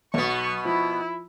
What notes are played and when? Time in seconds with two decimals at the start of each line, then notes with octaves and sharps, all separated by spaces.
0.14 B1 B2 B3 C#6
0.65 F3 E4